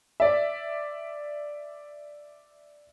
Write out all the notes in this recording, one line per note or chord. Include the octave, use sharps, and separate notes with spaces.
D5 E5